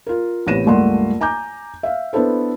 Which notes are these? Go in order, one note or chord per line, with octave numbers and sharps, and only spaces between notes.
F4 A#4
A1 C3 B3 A#6 D#7 E7
C#2 G2 A3 A#3 F#5 C6
G#5 A#5 D6 G6
E5 F5
B3 D4 E4 A4 C5